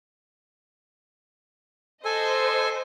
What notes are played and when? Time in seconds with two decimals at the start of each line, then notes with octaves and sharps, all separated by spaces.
2.05 A4 C5 D#5 G#5